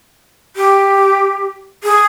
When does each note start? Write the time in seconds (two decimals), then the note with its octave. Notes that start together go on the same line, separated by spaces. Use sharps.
0.56 G4
1.83 G#4